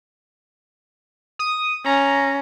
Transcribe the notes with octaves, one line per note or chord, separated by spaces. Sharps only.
D#6
C#4 A#5